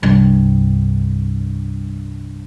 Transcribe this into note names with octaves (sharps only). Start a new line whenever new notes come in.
C2 G2